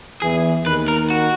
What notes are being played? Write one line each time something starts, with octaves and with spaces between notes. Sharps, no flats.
E2 E3 G#4
D#2 D#3 B4
A#4
F#4